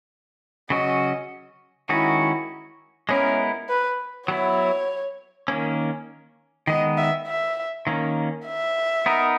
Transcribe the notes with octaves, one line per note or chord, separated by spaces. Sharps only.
C#3 F#3 C#4 F#4 D#5
D#3 G#3 C#4 E4 F#4
G#3 B3 C#4 E4 A#4
B4
F#3 B3 E4 C#5
D#3 A#3 C#4
D#3 G#3 B3 D#5
E5
E5
D#3 A#3 C#4
E5
B3 D#4 A#4